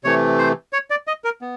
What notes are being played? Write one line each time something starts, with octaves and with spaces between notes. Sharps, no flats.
C3 E3 A3 C#5
C5
C#5
D5
D#5
A#4
B3